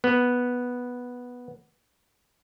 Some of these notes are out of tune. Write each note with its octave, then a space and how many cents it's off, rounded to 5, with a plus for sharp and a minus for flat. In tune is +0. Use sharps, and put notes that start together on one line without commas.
B3 -5